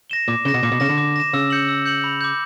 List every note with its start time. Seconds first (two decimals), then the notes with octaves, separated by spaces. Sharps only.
0.10 A#6 E7 G7
0.28 A#2 D6
0.45 C#3 A#6 E7 G7
0.54 B2
0.63 A#2 D6
0.72 B2
0.80 C#3 A#6
0.85 D3 E7
0.98 D6
1.16 A#6 E7
1.33 C#3 E6
1.50 G6 C#7 F#7
1.68 E6
1.85 G6 C#7 F#7
2.04 B5
2.21 D6 G6